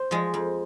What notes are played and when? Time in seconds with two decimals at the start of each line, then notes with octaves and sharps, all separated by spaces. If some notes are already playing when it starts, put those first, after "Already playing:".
Already playing: C5
0.11 F3 G#3
0.34 F2